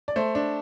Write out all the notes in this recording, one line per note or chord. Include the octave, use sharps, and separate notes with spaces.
D5
A3 C5
D4